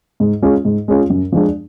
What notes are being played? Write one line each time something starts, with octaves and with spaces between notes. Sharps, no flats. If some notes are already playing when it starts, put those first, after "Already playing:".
G#2
G#3 C#4 F4
G#2
G#3 C#4 F4
F#2
F3 G#3 D4